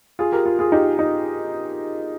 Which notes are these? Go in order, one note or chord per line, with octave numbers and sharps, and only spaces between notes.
F4 G#4
G4 A#4
F4
F4 G#4
D#4 G4
D#4